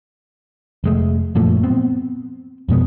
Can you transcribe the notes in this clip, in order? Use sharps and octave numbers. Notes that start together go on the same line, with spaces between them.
F1 G#3 A3
F#2 A#2 F3 A3
B3 C4
F2 B2 G#3 B3